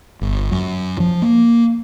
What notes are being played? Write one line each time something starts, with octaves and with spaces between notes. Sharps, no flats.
G1
F#2
F3
A#3